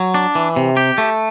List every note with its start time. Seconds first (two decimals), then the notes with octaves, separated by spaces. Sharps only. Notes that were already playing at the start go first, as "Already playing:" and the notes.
Already playing: F#3
0.14 D4
0.35 E3
0.56 C3
0.77 G4
0.98 A3